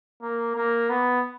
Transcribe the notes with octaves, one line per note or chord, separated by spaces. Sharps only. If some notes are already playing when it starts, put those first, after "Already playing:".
A#3
A#3
B3